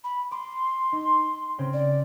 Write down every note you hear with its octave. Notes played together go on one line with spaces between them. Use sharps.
B5
C6 D6
D#4
C#3 C4
D5